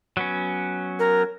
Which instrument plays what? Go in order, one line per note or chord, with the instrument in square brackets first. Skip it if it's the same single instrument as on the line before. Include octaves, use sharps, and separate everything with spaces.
[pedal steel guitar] F#3 B3 C#4
[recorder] A#4